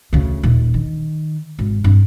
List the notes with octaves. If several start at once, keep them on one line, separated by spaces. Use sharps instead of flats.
D2 C#3
D#1
D#3
G#1
G2 C4